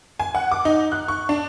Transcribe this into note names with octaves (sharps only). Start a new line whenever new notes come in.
G#5
F#5
D6
D#4
F#6
C#6
D4